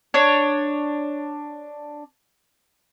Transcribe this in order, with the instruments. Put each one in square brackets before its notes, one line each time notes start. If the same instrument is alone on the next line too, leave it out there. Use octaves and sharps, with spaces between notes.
[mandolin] D4 C#5